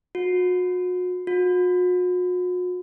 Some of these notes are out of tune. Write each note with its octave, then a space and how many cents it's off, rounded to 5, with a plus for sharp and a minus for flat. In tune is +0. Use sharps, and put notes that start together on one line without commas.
F#4 -35
F#4 -45